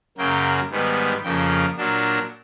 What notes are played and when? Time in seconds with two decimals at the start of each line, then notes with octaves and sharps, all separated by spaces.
0.18 F#2 C#3 F#3 A#3 G5
0.71 G#2 D#3 G3 B3
1.23 F2 C#3 F3 A#3 G5
1.77 A#2 F#3 A#3 D4